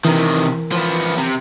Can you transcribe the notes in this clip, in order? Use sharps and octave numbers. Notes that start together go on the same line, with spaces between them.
C3 D#3 E3 A#4
F3 B3
C3